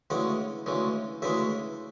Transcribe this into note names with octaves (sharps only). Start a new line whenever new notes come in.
D2 C#3 E3 G#3 F#5
D2 C#3 E3 G#3
D2 C#3 E3 G#3 E5